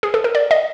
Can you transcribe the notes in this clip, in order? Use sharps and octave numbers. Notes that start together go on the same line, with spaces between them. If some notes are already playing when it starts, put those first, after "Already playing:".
G#4
A4
A#4
D5
D#5